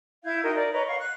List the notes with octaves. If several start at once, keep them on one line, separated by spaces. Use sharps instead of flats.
E4 F5 G6 G#6
D#4 F#4 A#4 G5
A#4 D5
B4 C#5 D#5 A#5
F5 F#5 C#6
F#6